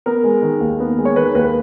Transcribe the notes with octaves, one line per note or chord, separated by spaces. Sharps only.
B3 A#4
G#3
D#3
D#2
B3
G#3
C#5
D#3 B4
D#2 B4